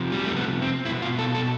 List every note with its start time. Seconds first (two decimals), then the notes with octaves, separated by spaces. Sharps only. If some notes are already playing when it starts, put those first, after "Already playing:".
Already playing: C3 F3
0.12 G3
0.25 A3
0.37 B3
0.62 C4
0.85 B2 E4
1.02 F4
1.19 A4
1.35 A4